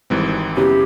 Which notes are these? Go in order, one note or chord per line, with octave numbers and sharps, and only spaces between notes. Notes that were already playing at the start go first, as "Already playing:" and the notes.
G#1 G#2 E3 G3 C4
F#2 C#3 F#3 B3 E4 G4